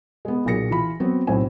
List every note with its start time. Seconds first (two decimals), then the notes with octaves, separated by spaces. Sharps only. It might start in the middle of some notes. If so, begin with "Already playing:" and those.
0.25 G#3 B3
0.45 B1 A#2 G#4 A#6 C#7
0.71 E3 F4 B5
1.00 F#3 B3 C4
1.27 B1 A2 C4 C5 G#5